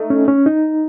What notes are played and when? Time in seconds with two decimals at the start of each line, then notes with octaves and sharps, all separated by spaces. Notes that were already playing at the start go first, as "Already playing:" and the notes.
Already playing: A3 D#4
0.10 C#4
0.28 C#4
0.46 D#4